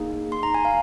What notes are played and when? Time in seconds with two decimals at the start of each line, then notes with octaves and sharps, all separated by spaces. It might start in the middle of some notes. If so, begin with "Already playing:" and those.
Already playing: A#3 D#4 G#4
0.32 C6
0.43 A#5
0.54 G#5
0.65 F5